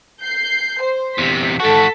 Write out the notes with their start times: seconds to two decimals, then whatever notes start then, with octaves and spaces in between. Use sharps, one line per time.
0.23 G6 C7
0.81 C5
1.18 E2 C3 B6
1.60 G#2 F#4 A4 A5 B6